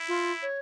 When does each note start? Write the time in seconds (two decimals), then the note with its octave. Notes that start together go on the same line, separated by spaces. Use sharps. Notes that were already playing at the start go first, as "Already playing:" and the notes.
Already playing: E4
0.08 F4
0.42 C#5